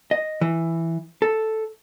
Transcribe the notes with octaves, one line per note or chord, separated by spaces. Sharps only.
D#5
E3
A4